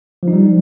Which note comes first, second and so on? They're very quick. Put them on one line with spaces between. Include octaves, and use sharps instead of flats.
F3 D#4 G3